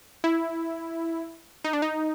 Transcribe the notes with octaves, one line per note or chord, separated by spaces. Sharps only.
E4
D#4
D4
D#4